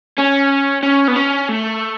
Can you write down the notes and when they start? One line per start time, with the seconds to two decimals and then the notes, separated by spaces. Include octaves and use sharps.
0.18 C#4
0.83 C#4
1.08 B3
1.16 C#4
1.49 A3